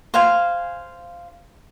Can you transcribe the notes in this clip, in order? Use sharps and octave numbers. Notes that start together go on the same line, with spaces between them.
C5 F5 G#5